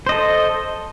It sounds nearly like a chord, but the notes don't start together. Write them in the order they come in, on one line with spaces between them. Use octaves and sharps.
C5 D#5 A4